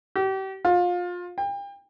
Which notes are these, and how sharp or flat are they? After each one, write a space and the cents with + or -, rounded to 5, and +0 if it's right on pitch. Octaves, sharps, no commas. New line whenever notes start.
G4 -35
F4 +25
G5 +35